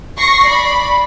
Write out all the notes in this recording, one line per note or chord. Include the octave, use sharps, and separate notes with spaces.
C#6 A#6 C7
D5 B5